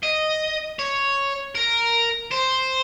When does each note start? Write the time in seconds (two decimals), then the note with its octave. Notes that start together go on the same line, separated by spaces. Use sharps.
0.03 D#5
0.79 C#5
1.55 A#4
2.32 C5